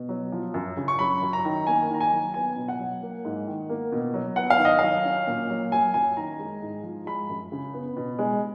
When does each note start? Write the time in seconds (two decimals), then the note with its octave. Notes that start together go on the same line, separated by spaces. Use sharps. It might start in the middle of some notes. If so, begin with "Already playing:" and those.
Already playing: B2
0.09 F#3
0.32 F3
0.54 F#2
0.77 C#3
0.88 C#6
0.99 F#3 B5
1.22 F#2
1.33 A#5
1.45 D#3
1.67 A#3 G#5
1.90 D#3 A#5
2.00 G#5
2.12 F#3
2.34 B3 G#5
2.56 B2
2.68 F#5
2.79 F#3
3.02 A#3
3.25 G#2
3.47 D#3
3.70 A#3
3.92 B2
4.14 F#3
4.36 B3 F#5
4.50 F5
4.59 D#3
4.65 D#5
4.79 F#3 F5
5.05 C#4
5.27 A#2
5.50 F#3
5.72 F#3 G#5
5.94 F#2 G#5
6.17 D#3 A#5
6.39 G#3
6.62 G#2
6.84 F3
7.06 G#3 B5
7.29 F#2
7.52 C#3
7.73 B3
7.97 B2
8.19 G#3